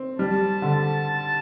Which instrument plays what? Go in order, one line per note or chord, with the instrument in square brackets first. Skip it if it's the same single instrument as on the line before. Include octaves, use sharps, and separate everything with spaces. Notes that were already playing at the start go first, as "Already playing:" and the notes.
Already playing: [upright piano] C4
[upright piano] G3 [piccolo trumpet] A5
[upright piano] D3